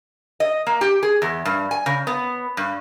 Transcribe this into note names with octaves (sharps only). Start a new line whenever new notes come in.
D#5
A#3
G4
G#4
E2
G2
G#5
C#3
B3
G2